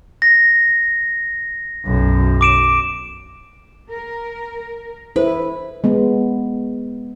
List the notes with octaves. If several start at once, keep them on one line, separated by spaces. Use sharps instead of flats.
A#6
B1 F#2
D6 D7 E7
A#4
E4 A4 B4 C5
G#3 B3